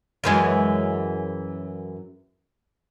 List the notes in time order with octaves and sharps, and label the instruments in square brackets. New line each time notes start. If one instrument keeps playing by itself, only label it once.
[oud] F#2 E3 G#3